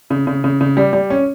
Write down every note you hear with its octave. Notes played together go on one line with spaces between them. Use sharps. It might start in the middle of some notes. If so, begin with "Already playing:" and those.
C#3
C#3
C#3
C#3
G3
G3
C#4